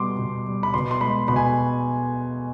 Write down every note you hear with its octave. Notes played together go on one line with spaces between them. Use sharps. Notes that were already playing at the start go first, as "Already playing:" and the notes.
Already playing: B2 G3 C6 D6
B2
G3
B5
B2 C6
C6
G#3 B5
B2 B5
G#5